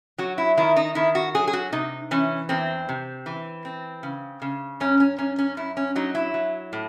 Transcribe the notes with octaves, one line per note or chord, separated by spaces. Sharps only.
F#3 F#4
E4
D#3 E4
D#4
D#3 E4
F#4
F#3 G#4
G#4
F#4
C3 D#4
E3 C#4
E2 C4
C3
E3
C4
C#3
C#3
F#2 C#4
C#4
F#2 C#4
C#4
F#2 E4
C#4
F#3 D#4
E4
F#3
A2